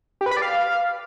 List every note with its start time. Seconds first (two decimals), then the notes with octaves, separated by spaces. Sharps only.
0.21 G4
0.26 B4
0.31 B5
0.37 D5
0.42 F5